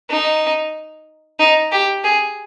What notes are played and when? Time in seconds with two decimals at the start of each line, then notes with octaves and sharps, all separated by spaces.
0.10 D#4
1.39 D#4
1.72 G4
2.04 G#4